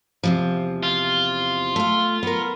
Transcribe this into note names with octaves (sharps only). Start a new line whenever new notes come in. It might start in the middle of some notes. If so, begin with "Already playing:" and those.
E2 C3 F3
F4
A3 F5
B3 A#4